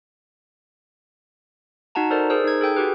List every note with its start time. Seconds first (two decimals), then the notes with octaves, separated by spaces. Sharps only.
1.95 D#4 F#4 F#5 A5 A#5
2.10 A4 A#4 C5 D5
2.30 G#4 A#4 C5 E6
2.44 D#4 G#6
2.61 G#4 A4 G5 G6
2.76 F#4 G4 B4